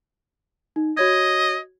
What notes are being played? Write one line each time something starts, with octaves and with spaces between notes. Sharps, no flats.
D#4
F#4 C#5 D#5 G#6